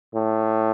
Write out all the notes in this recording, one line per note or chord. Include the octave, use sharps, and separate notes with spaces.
A2